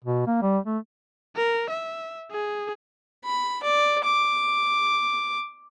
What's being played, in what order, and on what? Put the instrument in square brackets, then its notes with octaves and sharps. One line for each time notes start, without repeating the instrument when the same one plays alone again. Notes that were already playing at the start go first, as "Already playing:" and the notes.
[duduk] B2
A#3
G3
A3
[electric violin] A#4
E5
G#4
[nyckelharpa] B5
D5
D6